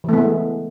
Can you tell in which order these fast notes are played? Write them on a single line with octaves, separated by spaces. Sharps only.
E3 A3 B3 G#3